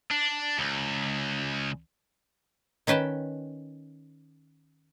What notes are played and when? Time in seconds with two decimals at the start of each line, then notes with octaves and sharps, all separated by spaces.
0.11 D4
0.59 C#2
2.87 D#3 C#4 B4 G5 A5